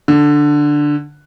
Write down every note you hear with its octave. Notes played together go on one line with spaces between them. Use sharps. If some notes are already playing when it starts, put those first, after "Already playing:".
D3